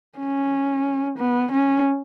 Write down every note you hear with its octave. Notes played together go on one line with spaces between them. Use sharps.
C#4
B3
C#4